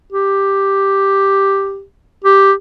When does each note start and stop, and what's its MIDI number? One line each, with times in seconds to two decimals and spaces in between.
0.12 1.83 67
2.24 2.53 67